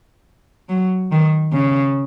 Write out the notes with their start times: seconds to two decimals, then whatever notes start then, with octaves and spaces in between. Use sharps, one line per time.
0.69 F#3
1.11 D#3
1.53 C#3